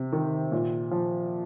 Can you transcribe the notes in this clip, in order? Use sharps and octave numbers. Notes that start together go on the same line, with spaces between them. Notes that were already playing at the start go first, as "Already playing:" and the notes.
Already playing: C3
D#3
A#2
F3